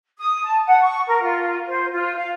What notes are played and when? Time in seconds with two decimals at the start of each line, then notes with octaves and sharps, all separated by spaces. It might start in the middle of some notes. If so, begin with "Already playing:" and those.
0.18 D#6
0.45 A5
0.66 F#5
0.82 C#6
1.07 A#4
1.21 F4
1.67 C5
1.91 F4
2.17 F5